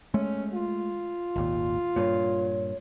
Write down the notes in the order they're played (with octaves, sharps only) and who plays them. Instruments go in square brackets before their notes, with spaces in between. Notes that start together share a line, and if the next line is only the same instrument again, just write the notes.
[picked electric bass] G#3 A3 [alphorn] C#4
[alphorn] F4
[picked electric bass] G#1 D#2 A#2
[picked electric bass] G2 A#2 [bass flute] C#5